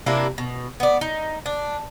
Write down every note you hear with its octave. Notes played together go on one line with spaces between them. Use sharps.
C3 A#3 D4 E4
B2
B3 D5
D#4
D4